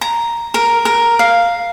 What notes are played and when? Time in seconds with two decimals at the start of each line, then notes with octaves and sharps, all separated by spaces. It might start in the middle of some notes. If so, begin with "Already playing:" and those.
0.01 A#5
0.54 A#4
0.85 A#4
1.19 F5